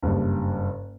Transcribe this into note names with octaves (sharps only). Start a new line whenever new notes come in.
F#1 G2